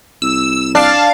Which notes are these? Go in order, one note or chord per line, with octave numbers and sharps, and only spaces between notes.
C2 E6
D4 F5 A5